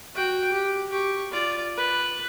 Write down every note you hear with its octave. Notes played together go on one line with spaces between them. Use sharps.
F#4 G5
G4
G4 C#6
F4 D5
B4